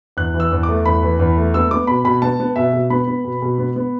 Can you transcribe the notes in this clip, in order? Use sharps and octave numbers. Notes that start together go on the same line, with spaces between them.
E2 F#6
E3
E6
E2
D6
A3
E2 B5
E3
E2
A3
B3 E6
B3 D6
B2 B5
B2 B5
B3 A5
B3
B2 E5
B2
B3 B5
B3
B2
B2
B3
B3